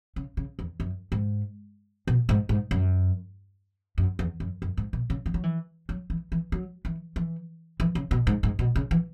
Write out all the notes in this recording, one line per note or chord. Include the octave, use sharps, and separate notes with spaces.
C#3
C#3
E2
F#2
G#2
B2
G#2
G#2
F#2
F#2
E2
F#2
F#2
G#2
B2
C#3
E3
F#3
E3
F#3
E3
E3
F#3
E3
E3
E3
C#3
B2
G#2
G#2
B2
C#3
E3